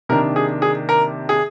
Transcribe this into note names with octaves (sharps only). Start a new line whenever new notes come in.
C3 D#3 A#3 D4 A#4
G#4
G#4
A#4
G#4